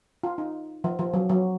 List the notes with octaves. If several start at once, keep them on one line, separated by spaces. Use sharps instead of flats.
F4
D#4
F3
F3
F#3
F#3